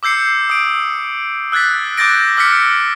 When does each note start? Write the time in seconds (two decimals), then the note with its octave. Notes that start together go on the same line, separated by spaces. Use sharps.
0.03 D6 E6 G6 C7 C#7
0.49 D#6 D7
1.52 E6 F#6 G#6 A6 B6
1.97 D6 F#6 G6 A6 A#6 D7
2.37 D6 E6 F6 A#6 B6 C#7